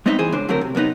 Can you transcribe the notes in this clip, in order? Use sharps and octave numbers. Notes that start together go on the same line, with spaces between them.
G#3 B3 C4 D#4 D#5 E5
G2 E3 G#4 C5
C#2 D4 C5
D3 F#3 A3 C4 A#4
C3
F#2 C3 B3 D#4